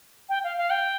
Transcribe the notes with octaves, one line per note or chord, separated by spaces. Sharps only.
G5
F5
F5
G5